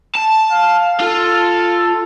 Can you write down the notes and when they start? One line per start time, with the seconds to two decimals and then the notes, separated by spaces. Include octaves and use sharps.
0.15 A5
0.52 F5
1.00 F4 A4